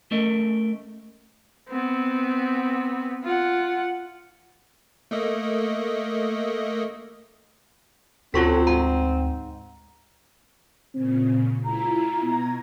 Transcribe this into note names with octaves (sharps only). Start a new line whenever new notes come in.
A3 C#4 A#4 D#5
B3 C4
F4 F#5
A3 A#3 D#5
D2 C4 C#4 F4 F#4 A4 C#6 B6
G#2 A#5
A#2 C#3 C4
C#2 E4 F4 A#5
B2 B3 G#6 A#6